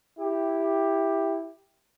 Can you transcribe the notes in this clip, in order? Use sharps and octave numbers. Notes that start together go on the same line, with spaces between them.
E4 G4